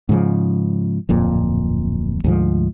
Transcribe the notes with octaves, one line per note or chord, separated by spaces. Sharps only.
G#2 C#3 E3 F3
D1 F2 A#2
D2 G#2 F3